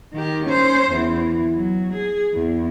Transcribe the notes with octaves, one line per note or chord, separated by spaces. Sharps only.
D#3 G4
C#4 C5
E2 E3
F#3
G#4
E2